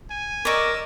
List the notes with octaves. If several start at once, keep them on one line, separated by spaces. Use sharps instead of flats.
G#5
A#4 D5 D#5 C#6 E6